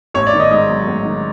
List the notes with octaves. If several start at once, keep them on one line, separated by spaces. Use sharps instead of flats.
A1 C#5
D5
D#3
D#5
G#2 D#5
F#3
A1
D#3